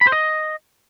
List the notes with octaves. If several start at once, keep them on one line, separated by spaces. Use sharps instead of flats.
B5
C5
D#5